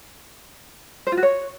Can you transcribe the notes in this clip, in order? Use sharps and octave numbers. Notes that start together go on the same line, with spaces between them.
C5
F4
F#4
C#5